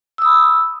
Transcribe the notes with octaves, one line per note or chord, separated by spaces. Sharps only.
B5 D#6 E6